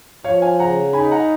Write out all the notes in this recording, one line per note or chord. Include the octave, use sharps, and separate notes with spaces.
F3 C#5 F5
F5 G#5
C#3 F#5 A#5
D#4 G#5 B5
F#5 A#5